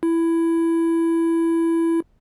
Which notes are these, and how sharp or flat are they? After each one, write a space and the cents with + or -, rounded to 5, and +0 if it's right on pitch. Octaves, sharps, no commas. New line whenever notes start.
E4 +10